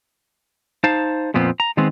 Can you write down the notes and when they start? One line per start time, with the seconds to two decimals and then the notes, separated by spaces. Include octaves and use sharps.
0.84 D#4 C5 F5 A5
1.34 F2 A#2 F3 B3 C4
1.60 A#5
1.77 D#3 G#3 B3 C4